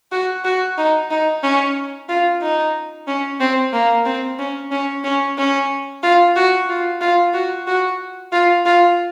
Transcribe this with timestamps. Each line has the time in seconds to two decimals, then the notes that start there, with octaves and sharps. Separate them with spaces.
0.12 F#4
0.45 F#4
0.78 D#4
1.10 D#4
1.43 C#4
2.09 F4
2.42 D#4
3.07 C#4
3.40 C4
3.73 A#3
4.06 C4
4.39 C#4
4.71 C#4
5.04 C#4
5.38 C#4
6.03 F4
6.36 F#4
6.69 F4
7.01 F4
7.34 F#4
7.67 F#4
8.32 F4
8.66 F4